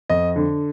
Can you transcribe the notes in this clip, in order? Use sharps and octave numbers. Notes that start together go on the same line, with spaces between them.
F2 D#5
D3